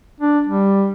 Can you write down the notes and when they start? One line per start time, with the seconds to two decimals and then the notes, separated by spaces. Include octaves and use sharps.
0.20 D4
0.47 G3